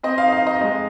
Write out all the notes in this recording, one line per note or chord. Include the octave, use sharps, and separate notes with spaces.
C4 D#5
D#4 F5
D#5
F5
D#4 D#5
G#3 D#5